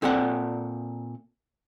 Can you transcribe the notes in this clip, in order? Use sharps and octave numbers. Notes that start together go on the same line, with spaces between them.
A#2 C4 A4 D5 F#5 A5